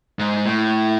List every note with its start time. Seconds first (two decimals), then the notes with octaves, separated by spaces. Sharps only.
0.19 G#2
0.46 A2